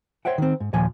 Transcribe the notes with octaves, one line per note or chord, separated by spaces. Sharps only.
C5 C#5 E5 F#5 G5
D#3 C4
G#2
D#2 A#2 F3 G#5